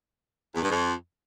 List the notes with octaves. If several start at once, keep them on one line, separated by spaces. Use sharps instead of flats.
E2
G2
F2